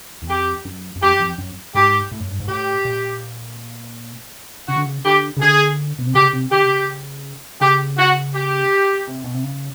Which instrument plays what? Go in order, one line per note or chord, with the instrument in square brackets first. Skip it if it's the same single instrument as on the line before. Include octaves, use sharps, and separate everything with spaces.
[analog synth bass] E2
[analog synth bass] F2 [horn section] G4
[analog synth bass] F#2
F#2
[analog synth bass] F2 [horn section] G4
[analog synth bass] F#2
F2
F#2
[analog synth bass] G#2 [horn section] G4
[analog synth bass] A2
F#2
G2
G#2
[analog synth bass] A2 [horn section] G4
[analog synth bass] A#2
[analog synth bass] C#3 [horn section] F#4
[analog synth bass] D3
C#3
[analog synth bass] D3 [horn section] G4
[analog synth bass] C#3
[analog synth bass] D3 [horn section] G#4
[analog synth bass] B2
C3
[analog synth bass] C#3 [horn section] G4
[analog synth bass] C3
[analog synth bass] D3 [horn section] G4
[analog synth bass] C3
C#3
[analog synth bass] C#3 [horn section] G4
[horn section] F#4
G4
[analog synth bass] C3
B2
C3
C#3